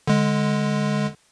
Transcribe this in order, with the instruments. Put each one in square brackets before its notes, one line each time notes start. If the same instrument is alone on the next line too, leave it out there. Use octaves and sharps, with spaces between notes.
[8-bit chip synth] D3 G#3